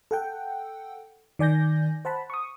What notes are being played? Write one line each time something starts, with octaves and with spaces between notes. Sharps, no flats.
A4 F#5 G5
D#3 D5 G#5 G6 A#6
C5 F#5 A5 B5
C#6 D#6